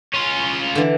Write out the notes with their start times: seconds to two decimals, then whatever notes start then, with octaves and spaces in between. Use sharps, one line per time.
0.14 C#4 F4
0.75 D3 E3